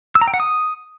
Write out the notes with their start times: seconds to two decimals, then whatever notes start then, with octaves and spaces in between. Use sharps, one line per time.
0.15 E6
0.21 A#5
0.28 G5
0.34 F#5
0.40 D#6